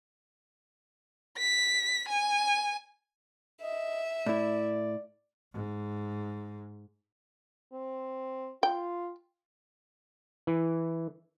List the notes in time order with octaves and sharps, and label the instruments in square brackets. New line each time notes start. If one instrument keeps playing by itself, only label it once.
[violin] B6
G#5
[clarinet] D#5 [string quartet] E5
[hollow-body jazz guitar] A2 E4 [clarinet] D5
[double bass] G#2
[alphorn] C4
[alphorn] F4 [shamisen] G5
[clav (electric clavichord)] E3